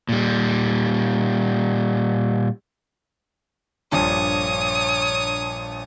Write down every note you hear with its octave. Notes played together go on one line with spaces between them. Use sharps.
A#2 G3
A#1 G2 A#2 C#5 D#6